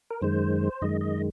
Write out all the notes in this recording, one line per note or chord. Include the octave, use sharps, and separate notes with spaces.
A#4
F#2 D#3 G#3 C5
F#2 D#3 G#3 D#5
D#5